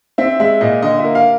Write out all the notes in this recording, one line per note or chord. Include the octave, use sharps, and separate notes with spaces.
C4 E5
G#3 E5
A#2 D#5
D3 D#5
E5
A#3
F5